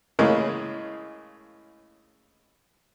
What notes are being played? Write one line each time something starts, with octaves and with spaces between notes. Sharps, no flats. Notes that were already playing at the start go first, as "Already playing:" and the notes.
A2 C#3 E3 G#3 A#3